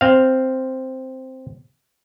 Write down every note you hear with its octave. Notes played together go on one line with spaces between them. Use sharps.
C4 F5